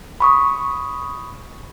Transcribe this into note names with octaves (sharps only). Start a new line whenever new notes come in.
B5 C#6 D#6